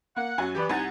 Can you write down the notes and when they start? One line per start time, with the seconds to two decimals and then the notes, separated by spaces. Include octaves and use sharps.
0.16 A#3 F#5
0.38 F#2 F#3 G#5
0.55 E3 B3 G4 B4 D5
0.69 C2 D#4 F#5 G#5 A6